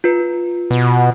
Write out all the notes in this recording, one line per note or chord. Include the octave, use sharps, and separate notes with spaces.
F4 B4
B2